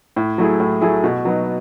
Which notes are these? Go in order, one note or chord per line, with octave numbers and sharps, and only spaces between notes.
A2
F#3 A3 E4 G#4
A2
F#3 A3 E4 G#4
B2
F#3 B3 D#4